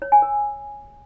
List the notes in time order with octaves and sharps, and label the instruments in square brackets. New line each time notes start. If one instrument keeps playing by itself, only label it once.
[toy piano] C#5
G#5
A#4